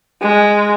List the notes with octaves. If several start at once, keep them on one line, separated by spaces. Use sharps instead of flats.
G#3